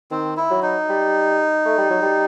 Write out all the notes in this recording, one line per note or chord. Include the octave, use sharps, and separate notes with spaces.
D#3 C4
E4
F#3
D#4
G3
A3
G3
F#3
G3